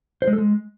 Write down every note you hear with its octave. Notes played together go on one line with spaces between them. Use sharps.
C5
G#3
A4
G#3